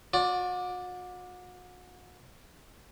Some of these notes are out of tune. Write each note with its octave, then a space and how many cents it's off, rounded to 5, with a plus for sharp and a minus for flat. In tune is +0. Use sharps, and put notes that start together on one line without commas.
F#4 -40 D5 +0